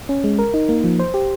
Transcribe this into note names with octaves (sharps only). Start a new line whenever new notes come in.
C#4
G#3
A#4
D#4
A#3
F3
C5
G4